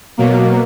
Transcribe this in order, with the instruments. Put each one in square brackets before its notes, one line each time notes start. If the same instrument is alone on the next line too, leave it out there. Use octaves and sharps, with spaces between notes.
[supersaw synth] B2 F#3 A#3